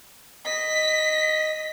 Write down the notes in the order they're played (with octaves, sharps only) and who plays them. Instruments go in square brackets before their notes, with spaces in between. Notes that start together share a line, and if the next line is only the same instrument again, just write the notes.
[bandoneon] D#5 [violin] B6